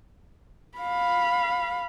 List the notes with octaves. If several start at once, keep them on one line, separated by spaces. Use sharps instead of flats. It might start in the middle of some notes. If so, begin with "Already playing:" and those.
F5 B5